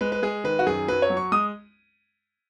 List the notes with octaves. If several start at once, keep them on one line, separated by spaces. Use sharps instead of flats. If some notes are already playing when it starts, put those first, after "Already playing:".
G#3 B4
B4
G#3 G#4
D#3 B4
F#4
F#2 G#4
F#3 B4
C#5
F#3
C#6
G#3 D#6